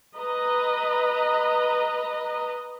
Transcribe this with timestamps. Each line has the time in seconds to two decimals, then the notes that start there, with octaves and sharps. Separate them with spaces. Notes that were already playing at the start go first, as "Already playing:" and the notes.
0.17 B4 D#5 A#5